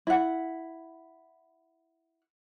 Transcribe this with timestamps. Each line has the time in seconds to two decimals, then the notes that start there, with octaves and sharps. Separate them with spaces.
0.07 E4 F#5